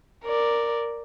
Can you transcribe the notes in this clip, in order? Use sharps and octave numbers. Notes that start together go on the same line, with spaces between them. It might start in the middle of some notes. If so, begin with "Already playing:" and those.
A#4 D5